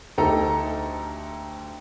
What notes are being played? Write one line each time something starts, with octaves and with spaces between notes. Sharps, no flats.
D2 D#4 G4 A4 A#5